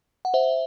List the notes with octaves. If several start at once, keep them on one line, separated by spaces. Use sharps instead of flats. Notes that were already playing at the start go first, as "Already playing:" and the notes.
F#5
C5 E5